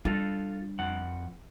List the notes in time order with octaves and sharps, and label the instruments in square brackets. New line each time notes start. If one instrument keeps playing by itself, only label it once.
[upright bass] G3 D4 [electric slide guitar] F4 A4 F5
[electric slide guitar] F2 F#5